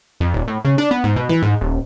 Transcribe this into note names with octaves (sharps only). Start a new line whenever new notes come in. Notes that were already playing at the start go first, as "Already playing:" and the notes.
F2
D#1
A2
C#3
D4
B3
G#2
B2
E3
G#2
D#1